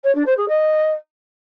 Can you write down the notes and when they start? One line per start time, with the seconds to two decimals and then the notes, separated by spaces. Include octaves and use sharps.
0.04 C#5
0.15 D4
0.26 C5
0.37 G#4
0.48 D#5